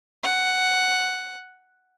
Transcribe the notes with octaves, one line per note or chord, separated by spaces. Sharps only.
F#5